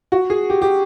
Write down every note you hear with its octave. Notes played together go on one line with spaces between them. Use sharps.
F#4
G#4
G4
G4